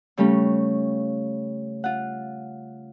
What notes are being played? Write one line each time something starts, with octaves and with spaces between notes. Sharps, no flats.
C#3 G3 A3 C#4
F4 F#5